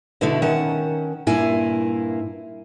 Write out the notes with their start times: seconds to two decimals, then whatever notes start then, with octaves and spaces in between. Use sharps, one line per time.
0.21 B2 D3 A3 E4
0.42 D#3 C#4 F#5 A5
1.27 G2 A#2 A#3 E4 G#5